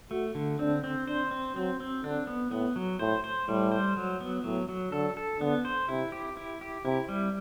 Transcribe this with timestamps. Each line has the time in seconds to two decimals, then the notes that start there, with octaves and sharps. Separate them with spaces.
0.11 A3 F#4
0.35 D3
0.59 C4 D4
0.84 C4
1.07 D4 C5
1.31 C4
1.56 F#3 C4
1.80 C4
2.03 D3 D4
2.27 B3
2.51 A2 B3
2.76 F#3
2.99 A2 C5
3.24 C5
3.48 A2 G3
3.72 C5
3.97 F#3
4.21 B3
4.44 A2 F#3
4.69 F#3
4.92 D3 A4
5.17 A4
5.40 D3 B3
5.65 C5
5.89 C3 E4
6.12 G4
6.37 E4
6.61 G4
6.85 C3 E4
7.09 G3